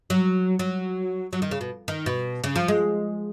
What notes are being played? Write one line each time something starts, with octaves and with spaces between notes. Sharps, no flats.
F#3
F#3
F#3
D#3
C#3
B2
D#3
B2
C#3
F3
G#3